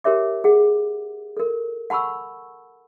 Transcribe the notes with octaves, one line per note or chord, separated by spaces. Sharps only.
G4 A#4 C#5 E5 D6
G#4 F#5
A4 A#4
F#5 A5 B5 C#6 E6